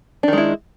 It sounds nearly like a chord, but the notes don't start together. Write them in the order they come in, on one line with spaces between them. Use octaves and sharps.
D4 D#3 G#3 E4